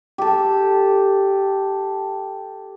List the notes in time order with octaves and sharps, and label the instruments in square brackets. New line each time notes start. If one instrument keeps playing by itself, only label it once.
[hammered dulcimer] G4 A4